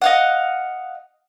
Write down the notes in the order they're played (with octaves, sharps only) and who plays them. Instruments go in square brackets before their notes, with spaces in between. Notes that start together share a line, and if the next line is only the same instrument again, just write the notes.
[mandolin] D#5 F5 F#5